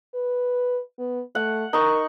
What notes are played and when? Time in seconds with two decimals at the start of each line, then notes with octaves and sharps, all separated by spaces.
0.14 B4
0.99 B3
1.35 A3 F#5
1.73 D#4 A#4 C#6